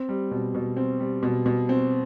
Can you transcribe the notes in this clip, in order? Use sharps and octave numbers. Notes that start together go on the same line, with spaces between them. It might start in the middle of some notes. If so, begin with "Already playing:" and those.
Already playing: C4
G3
B2
B2
C4
G3
B2
B2
C4